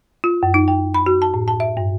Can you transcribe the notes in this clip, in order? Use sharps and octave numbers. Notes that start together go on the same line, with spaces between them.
F4
F#2
D#4
G5
B5
F#4
A5
A2
A5
E5
G2